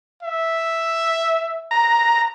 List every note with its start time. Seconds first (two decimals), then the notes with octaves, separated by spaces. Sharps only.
0.23 E5
1.71 A#5